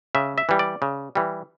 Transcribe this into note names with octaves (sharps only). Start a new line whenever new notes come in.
C#3 E5
E5
E3 G3
D5
C#3
E3 G3